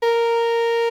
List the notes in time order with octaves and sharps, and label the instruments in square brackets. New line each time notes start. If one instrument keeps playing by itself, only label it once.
[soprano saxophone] A#4